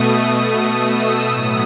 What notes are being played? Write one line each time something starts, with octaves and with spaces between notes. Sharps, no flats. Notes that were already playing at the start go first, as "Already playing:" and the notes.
Already playing: B2 A3 D#6
E6
A2 F#3 B3 D#6